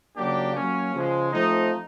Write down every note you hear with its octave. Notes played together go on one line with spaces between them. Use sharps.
C#3 F#3 A#3 D4 G4
F#3 A#3 C#4
C#3 F3 G#3
F3 A3 C4 D#4